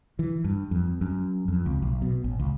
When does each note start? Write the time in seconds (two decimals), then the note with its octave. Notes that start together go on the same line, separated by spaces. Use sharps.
0.19 E3
0.44 G2
0.71 F2
1.01 F#2
1.48 F2
1.66 C#2
1.82 B1
2.02 B2
2.24 A1
2.39 C#2